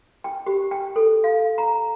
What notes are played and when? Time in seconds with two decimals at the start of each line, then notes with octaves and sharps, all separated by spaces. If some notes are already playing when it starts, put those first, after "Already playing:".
0.24 G5
0.46 G4
0.71 G5
0.96 A4
1.24 F5
1.58 A#5